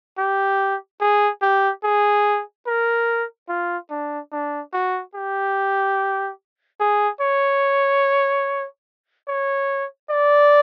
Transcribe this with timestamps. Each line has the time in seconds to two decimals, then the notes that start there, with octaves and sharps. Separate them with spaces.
0.18 G4
1.01 G#4
1.42 G4
1.84 G#4
2.67 A#4
3.49 F4
3.90 D4
4.32 D4
4.73 F#4
5.15 G4
6.80 G#4
7.21 C#5
9.28 C#5
10.11 D5